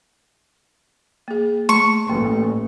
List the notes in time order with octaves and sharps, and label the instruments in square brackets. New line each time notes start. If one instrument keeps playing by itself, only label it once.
[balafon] A#3 G#4
[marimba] A3 [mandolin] C#6
[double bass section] A1 [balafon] A#3 C6